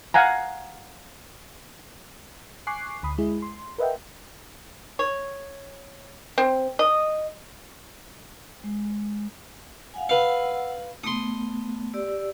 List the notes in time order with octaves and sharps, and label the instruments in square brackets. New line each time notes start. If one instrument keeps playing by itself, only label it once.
[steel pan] F5 F#5 G#5 A#5
[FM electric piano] G#5 C#6 D6 F#6 C7
D2 B5 D#6
G#3 E4 G#4
C6
A#4 B4 D#5 E5 F#5 G5
[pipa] C#5
C4
D#5
[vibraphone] G#3
F5 F#5 G#5
[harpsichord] B4 F5 [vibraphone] F#5 E6
[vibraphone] A3 B3 [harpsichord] C6 D#6
[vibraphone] G4 D5 E6